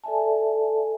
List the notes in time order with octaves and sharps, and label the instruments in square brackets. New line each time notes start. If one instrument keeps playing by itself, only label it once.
[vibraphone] A4 D5 E5 G#5 A5